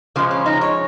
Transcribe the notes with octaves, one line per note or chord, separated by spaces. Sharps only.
C#3 F3 G#3 A#3
C#4
D#4
C#5